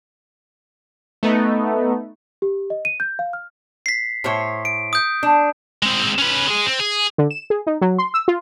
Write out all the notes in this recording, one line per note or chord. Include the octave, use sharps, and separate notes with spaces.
A3 B3 D#4
G4
D#5
D#7
G6
F5
F6
B6 C7
A2 C5 C#5
D7
D#6 G6
D4
G#3 C4
C#4 B4
G#3 G#4
C4
G#4
D3
E7
G#4
D#4
F#3
C6
E6
F4